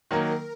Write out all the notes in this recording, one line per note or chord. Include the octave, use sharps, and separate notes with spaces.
D#3 F#3 A#3 A#4